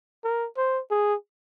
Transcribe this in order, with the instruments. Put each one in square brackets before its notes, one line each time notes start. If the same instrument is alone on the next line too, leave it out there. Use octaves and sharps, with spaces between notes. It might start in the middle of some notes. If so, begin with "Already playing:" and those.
[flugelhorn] A#4
C5
G#4